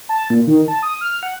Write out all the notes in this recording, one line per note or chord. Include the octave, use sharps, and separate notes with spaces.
A5
A#2
D#3
A5
D#6
F6
F#5